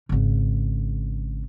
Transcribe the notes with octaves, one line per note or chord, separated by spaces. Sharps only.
G#1 C#3